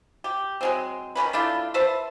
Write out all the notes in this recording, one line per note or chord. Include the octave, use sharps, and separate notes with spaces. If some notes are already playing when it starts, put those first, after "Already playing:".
G4
F#3 G#3 C4
D#3 G#3 C#4 B4
A3 D4 E4 F4
B4 C5 E5 A5